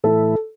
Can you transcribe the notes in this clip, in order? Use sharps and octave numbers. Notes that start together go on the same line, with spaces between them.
A2 E3 A3 E4 A4